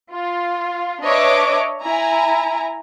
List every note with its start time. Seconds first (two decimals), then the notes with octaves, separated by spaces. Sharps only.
0.12 F4
1.03 D4 B4 C#5 D#5 E5 D6
1.82 E4 G#5 A#5